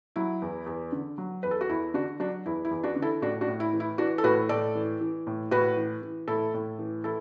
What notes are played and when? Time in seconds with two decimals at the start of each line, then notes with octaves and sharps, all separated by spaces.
0.16 F#3 E4
0.42 E2
0.66 E2
0.92 D3
1.18 F#3
1.43 E2 B4
1.51 A4
1.61 F#4
1.69 E2 E4
1.94 D3 D4 F#4
2.20 F#3 D4 F#4
2.46 E2 E4
2.65 E4
2.71 E2
2.83 D4 F#4
2.96 D3
3.02 E4 A4
3.22 A2 D4 F#4
3.41 D4 F#4
3.48 A2
3.60 E4
3.73 E3
3.80 E4
3.98 E3 D4 F#4
4.18 A4
4.24 A2 F#4 B4
4.49 A2 A4 D5
4.75 E3
5.01 E3
5.27 A2
5.51 A2 F#4 B4
5.77 E3
6.02 E3
6.28 A2 E4 A4
6.54 A2
6.79 E3
7.04 E3 E4 A4